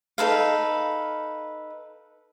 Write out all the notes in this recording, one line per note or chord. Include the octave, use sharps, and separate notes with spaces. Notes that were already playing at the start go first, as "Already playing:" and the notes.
D#4 A4 B4 F5